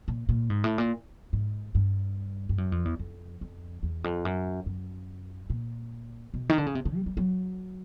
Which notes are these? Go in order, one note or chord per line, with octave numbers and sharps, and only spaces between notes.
A#2
A#2
G#2
A2
A#2
G#2
G2
G2
F#2
F2
E2
F2
F2
E2
F2
F#2
F#2
A#2
B2
D#3
D3
C#3
C3
C#3
G3
G3
F#3